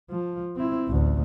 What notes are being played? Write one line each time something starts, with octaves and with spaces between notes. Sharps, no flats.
F3
C4 E4
A1 D2